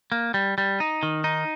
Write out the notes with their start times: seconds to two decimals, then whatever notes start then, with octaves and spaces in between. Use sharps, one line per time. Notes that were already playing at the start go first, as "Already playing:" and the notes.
0.12 A#3
0.34 G3
0.58 G3
0.80 D#4
1.03 D#3
1.24 D#4